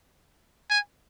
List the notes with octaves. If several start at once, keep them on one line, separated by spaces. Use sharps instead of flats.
G#5